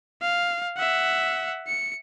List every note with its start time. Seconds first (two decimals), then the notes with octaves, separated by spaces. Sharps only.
0.22 F5
0.77 E5 F#5
1.68 C#7